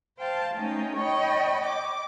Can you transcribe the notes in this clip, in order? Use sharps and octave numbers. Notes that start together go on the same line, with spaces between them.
C5 F5 G5 A5
A3 C#4 D#4 G5
C#5 D#5 G5 B5
D6